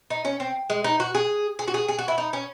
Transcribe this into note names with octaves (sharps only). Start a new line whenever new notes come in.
D#4
C#4
C4
G#3
D#4
F#4
G#4
G#4
F#4
G#4
G#4
F#4
E4
D#4
C#4